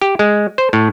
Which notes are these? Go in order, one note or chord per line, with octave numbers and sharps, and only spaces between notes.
G4
G#3
C5
A2